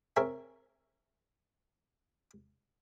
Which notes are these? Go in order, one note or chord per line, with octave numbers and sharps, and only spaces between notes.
C4 G#4 A#4 C#5 E5